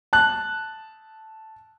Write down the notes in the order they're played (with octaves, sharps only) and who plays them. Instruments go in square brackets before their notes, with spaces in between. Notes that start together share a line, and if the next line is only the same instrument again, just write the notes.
[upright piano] A5 F#6